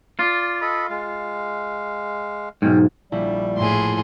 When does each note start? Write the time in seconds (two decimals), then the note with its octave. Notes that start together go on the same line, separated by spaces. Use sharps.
0.19 F4 D5 C6
0.61 A4 D#5 B5
0.90 G#3 F5
2.62 B1 G#2 C#4 G5
3.12 A#1 G3 E4
3.58 A2 G#4 C6